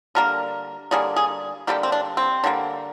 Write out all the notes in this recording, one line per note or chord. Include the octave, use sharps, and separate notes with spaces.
D3 G3 A#3 A#4
D3 G3 A#3 G#4
G#4
D3 G3 A#3 G4
C4
D4
C4
D3 G3 A#3